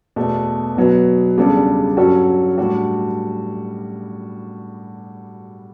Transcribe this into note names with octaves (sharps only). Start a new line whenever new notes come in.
E2 B2 A3
B2 F#3 B3
E2 C#3 G3 D4 A4
G2 F#3 C#4 F#4 A4
A2 G3 D4 F#4